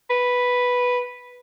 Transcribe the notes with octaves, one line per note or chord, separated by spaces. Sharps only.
B4